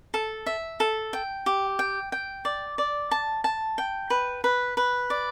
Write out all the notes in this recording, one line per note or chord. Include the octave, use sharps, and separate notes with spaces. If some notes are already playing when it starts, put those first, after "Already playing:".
A4
E5
A4
G5
G4
G5
G5
D5
D5
A5
A5
G5
B4
B4
B4
D5